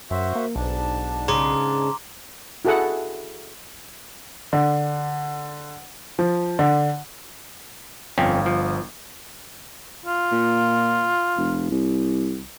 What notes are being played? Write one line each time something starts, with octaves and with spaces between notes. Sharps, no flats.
F#2 F#4 C5 E5
A#3
B1 G#2 D4 A5
C#3 A#5 C6 D6
E4 F#4 G#4 A4 F#5
D3
F3
D3
G1 F2 C4 C#4 F5 G5
F3
F4
A#2
F1
C2